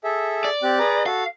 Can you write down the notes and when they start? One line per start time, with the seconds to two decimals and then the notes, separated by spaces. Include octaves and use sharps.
0.04 G#4 A4 E5
0.45 D5
0.63 C4 G4 F#6
0.79 G#4 B4 A#5
1.06 F#4 A4 F5